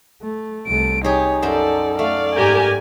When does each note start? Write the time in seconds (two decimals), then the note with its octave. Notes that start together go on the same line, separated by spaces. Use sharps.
0.22 A3
0.67 C2 A3 D7
1.04 D#4 G4 G#4 C#5
1.42 F#2 A4 C5 D5
1.99 A3 D5 F5
2.36 G#2 G4 A#4 G#5